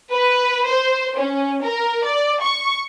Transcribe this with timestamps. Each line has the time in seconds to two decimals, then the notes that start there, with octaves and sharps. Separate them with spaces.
0.11 B4
0.68 C5
1.18 C#4
1.63 A#4
2.05 D5
2.41 C#6